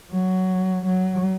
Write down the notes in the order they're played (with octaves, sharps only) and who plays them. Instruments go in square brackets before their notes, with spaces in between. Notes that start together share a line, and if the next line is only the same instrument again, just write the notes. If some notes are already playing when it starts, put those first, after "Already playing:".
[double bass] F#3
F#3